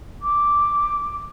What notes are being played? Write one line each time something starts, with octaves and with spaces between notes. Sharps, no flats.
D6